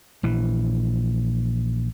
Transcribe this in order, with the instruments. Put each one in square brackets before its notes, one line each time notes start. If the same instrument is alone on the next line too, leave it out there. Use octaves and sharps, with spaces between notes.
[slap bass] A#1 E3